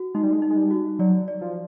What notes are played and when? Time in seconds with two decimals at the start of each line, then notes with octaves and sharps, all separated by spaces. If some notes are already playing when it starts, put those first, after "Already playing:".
Already playing: F#4
0.15 G#3 D#4
0.23 G3
0.32 G#3
0.42 D#4
0.50 G#3
0.57 G3
0.71 F#4
0.99 F#3 D5
1.28 D5
1.41 F3